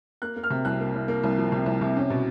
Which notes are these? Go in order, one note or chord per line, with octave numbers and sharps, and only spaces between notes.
A#3 F#6
A#3
F6
C3
C2 F#6
A#3
C2
A#3
C2
F3
C3
C2
C3
C#4
B2